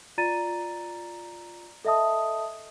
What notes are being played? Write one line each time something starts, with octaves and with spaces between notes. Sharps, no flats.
F4 D5 A#5 A6 D#7
A4 D#5 E5 A5 D#6